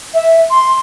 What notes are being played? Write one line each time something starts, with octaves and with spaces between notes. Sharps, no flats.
E5
C6